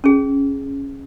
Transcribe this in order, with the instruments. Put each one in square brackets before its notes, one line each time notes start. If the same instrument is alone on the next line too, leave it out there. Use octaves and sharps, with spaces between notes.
[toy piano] C#4 G#4